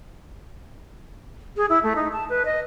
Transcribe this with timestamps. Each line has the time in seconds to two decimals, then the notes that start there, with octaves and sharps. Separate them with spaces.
1.57 G#4
1.69 E4
1.83 A3
1.96 D#4
2.13 A5
2.29 B4
2.45 D#5